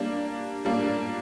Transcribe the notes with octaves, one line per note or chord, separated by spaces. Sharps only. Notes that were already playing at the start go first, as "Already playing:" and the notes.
Already playing: G3 A#3 D4
G3 A#3 D4